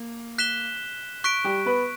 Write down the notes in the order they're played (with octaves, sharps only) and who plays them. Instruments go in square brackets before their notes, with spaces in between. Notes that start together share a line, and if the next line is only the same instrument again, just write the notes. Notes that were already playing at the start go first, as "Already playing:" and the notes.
Already playing: [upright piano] A#3
[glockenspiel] F#6 B6 E7 G7
C#6 F#6 B6 D7
[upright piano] G3 G4
B3 B4